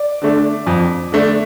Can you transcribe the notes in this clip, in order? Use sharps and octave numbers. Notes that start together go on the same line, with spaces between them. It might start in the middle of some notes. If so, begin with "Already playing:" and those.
Already playing: D5 D6
D3 A3 D4
F2
D3 A3 D4